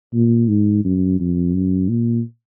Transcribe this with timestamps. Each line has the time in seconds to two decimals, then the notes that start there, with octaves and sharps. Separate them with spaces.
0.14 A#2
0.49 G#2
0.85 F#2
1.20 F2
1.54 F#2
1.89 A#2